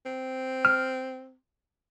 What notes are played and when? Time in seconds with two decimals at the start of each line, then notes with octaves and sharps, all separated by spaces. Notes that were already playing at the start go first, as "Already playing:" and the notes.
0.05 C4
0.65 F6